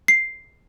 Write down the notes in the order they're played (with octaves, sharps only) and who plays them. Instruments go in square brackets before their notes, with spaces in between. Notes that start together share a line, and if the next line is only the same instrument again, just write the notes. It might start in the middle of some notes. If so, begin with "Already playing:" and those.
[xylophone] C7